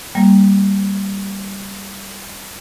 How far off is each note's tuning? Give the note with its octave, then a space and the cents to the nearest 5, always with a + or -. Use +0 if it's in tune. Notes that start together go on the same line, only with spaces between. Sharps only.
G3 +0 A#3 +0